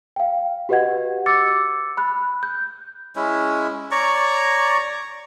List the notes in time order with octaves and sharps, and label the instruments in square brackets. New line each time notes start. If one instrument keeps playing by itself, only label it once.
[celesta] F5 G5
F#4 G4 B4 D#5 F#5 G#6
D6 E6 A6 C#7
B5 F#6
G6
[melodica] G#3 C#4 E4
C#5 D5 A#5 C#6